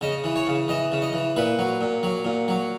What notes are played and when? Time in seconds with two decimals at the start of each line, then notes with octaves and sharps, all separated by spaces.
0.01 C#3 D#5
0.24 E3
0.36 C#5
0.47 C#3
0.68 E3 D#5
0.92 C#3
1.02 D#5
1.13 E3
1.36 A#2 B4
1.59 F#3
1.81 A#2
2.03 F#3
2.25 A#2
2.48 F#3